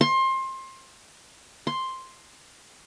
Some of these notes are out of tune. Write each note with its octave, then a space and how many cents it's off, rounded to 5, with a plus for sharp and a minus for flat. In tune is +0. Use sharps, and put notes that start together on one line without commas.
C6 +25
C6 +5